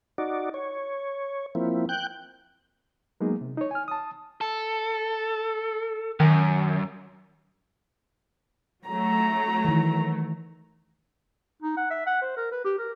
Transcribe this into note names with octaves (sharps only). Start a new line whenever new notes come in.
D#4 F#4 D5
C#5
F3 A#3 C4 E4
G5 F#6 G6
F#3 G#3 A#3 B3 D#4 G#4
C3
D#4 C#5
G#5 F6
A5 D#6
A4
F#2 D#3
F#3 A3 A#5
D#3 E3
D#4
F#5
E5
F#5
C5
A#4
B4
G4
A#4